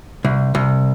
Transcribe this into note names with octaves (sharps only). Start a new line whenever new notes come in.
C2
C2